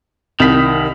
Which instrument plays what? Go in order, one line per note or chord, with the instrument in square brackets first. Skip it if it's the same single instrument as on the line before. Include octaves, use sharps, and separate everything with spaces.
[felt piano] C2 B6 [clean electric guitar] D#3